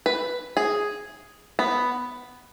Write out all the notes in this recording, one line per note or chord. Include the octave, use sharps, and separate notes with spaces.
B4
G#4
B3